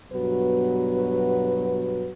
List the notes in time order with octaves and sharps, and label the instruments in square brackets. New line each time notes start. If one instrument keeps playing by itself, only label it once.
[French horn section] G2 B2 F#3 B3 F#4 B4